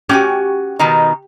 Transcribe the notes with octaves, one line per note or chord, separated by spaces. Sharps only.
C#4 F#4 G4 G#5
B2 D#3 D#4